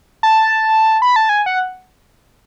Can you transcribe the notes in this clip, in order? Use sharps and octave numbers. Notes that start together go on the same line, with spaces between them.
A5
B5
A5
G#5
F#5